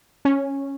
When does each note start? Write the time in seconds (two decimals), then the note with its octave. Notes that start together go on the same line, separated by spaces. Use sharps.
0.25 C#4